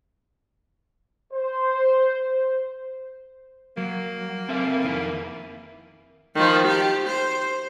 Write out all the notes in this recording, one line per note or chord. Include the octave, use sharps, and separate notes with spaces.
C5
F#3 A#3
C4 A4 E5
F2 D#3 E4
D#3 F3
G4
C5